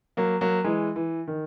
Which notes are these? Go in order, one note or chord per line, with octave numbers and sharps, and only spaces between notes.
F#3 A#3
F#3 A#3
E3 G#3
E3
D#3